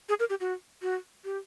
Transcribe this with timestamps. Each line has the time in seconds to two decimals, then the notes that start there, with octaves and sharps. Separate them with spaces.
0.09 G#4
0.20 A#4
0.30 G4
0.41 F#4
0.82 F#4
1.25 G4